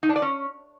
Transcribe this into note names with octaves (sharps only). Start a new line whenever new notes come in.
D#4
D4
D5
C#4